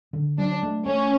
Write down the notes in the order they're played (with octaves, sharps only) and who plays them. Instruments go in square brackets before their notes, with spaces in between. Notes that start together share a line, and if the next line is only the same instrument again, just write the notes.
[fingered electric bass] D3
[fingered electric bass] F#3 [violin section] D4
[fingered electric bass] A3
[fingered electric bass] A3 [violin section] C#4